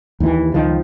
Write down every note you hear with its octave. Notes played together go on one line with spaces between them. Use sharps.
D#2 E3
C#2 D#3 F3